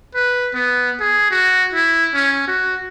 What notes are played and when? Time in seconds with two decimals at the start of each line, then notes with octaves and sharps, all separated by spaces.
0.15 B4
0.54 B3
1.00 G#4
1.31 F#4
1.73 E4
2.14 C#4
2.47 F#4